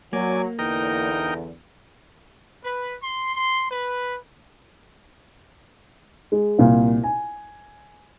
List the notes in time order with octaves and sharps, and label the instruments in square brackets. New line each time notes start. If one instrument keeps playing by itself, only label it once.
[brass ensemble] F#3 [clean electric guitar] A#3 [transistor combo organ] D5 G#5
[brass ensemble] E2 D3 [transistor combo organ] D#4 A#4 G5
[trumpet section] B4
C6
C6
B4
[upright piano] G#3
C2 A#2 F5
G#5